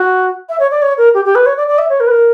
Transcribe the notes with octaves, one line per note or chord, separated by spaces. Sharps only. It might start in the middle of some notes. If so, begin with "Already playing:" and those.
Already playing: F#4
E5
C#5
D5
C#5
A#4
G4
G4
B4
C#5
D5
D5
E5
C#5
A#4
B4
A#4